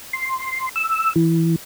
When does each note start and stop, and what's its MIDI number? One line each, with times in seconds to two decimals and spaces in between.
0.13 0.69 84
0.76 1.13 88
1.16 1.56 52